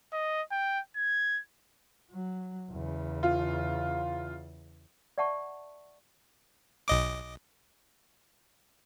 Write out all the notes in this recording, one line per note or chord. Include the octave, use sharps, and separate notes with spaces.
D#5
G5
G#6
F#3
E2 C#3
F4
D5 E5 F#5 A5 C#6
B1 D#5 D6